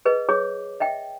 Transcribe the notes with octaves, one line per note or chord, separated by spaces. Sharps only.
G#4 B4 D#5
G#4 C#5 D6
D#5 E5 G5